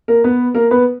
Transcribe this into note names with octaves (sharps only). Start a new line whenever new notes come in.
A#3 A#4
B3 B4
A#3 A#4
B3 B4